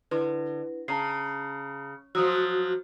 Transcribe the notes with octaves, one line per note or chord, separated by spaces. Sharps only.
D3 E4 B4
C#3 A5 A#5 C7
F3 F#3 F#4 D#6 E6